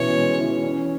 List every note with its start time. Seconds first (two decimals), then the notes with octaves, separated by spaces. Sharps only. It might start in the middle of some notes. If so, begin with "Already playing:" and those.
Already playing: B2 E3 C#4 C#5
0.16 G#3
0.39 E3
0.63 C#4